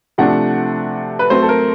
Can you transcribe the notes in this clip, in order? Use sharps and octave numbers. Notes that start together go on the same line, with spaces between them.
C3 F3 A3 D4 F#5
B4
F#3 A3 C4 C5
A4
A#4